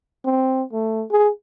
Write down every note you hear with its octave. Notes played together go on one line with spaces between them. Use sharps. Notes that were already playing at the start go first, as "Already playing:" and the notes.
C4
A3
G#4